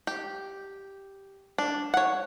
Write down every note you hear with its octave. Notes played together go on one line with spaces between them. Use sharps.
G4
D4
C#5 F#5